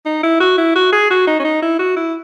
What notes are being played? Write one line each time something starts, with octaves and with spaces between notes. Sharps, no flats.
D#4
E4
F#4
E4
F#4
G#4
F#4
D#4
C#4
D#4
E4
F#4
E4